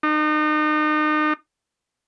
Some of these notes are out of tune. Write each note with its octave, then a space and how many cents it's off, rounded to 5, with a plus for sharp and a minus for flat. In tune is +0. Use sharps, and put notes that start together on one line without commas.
D#4 -35